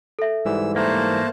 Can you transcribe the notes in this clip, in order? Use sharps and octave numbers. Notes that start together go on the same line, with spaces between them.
A4 E5
G#2 E3 G3 E6
A3 A#3 C5 A5